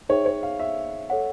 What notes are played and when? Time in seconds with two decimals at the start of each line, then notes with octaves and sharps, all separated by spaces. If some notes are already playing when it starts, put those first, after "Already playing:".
0.09 D#4 G#4 C5 C#5 E5 G5
0.26 C#5
0.43 F5
0.59 E5
1.10 A4 C#5 F#5